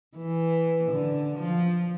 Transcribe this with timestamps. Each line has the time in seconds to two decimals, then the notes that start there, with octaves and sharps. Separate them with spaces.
0.18 E3
0.91 D3
1.38 F3